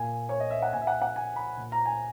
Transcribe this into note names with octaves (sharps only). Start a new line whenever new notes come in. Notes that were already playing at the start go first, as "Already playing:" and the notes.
Already playing: A#2 G#5
C#5
D#5
E5
F#5
A#2 G#5
E5
F#5
F#5
G#5
B5
A#2
A#5
G#5